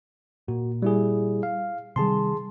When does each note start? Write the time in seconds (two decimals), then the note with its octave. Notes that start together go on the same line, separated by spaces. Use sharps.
0.48 A#2 F#4
0.82 G3 E4 G#4
1.43 F5
1.96 C3 D#3 G3 G#4 A5 C6